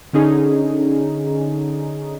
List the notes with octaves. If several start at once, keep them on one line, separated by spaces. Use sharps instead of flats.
D3 C#4 D#4 G#4